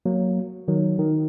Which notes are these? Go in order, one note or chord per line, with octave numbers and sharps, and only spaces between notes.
F#3 A#3
D#3 F#3
D#3